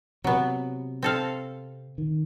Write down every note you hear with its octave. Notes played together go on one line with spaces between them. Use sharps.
C3 F#3 B3
C4 A4 F5
D#3